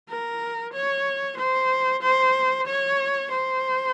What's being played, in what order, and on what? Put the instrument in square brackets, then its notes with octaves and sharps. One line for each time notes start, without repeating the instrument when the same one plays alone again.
[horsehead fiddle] A#4
C#5
C5
C5
C#5
C5